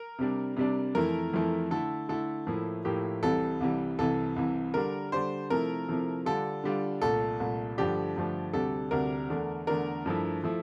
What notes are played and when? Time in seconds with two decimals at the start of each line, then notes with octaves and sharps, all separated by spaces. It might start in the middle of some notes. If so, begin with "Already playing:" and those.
Already playing: A#4
0.19 C3 G3 D4
0.57 C3 G3 D4
0.95 F2 E3 A3 E4 A#4
1.33 F2 E3 A3 E4
1.71 D3 A3 E4 A4
2.09 D3 A3 E4 A4
2.47 A2 F3 A#3 E4
2.85 A2 F3 A#3 E4 G4
3.23 C2 C3 E3 G3 A4
3.60 C2 C3 E3 G3
3.98 C2 C3 E3 A4
4.36 C2 C3 E3
4.74 D3 G3 D4 A#4
5.12 D3 G3 D4 C5
5.50 C3 F3 A3 E4 A#4
5.88 C3 F3 A3 E4
6.25 D3 G3 D4 F4 A4
6.64 D3 G3 D4 F4
7.02 C2 A#2 A3 A4
7.40 C2 A#2 A3
7.78 G2 D3 F3 A3 D4 G4
8.16 G2 D3 F3 A3 D4
8.53 D2 C3 G3 D4 A4
8.91 D2 C3 G3 D4 A#4
9.29 E2 D3 A3 D4
9.67 E2 D3 A3 D4 A#4
10.06 G2 F3 A3 E4
10.44 F3 A3 E4